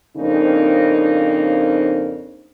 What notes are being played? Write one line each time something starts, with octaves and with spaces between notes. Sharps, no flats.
F2 C#3 A#3 C4 D4 D#4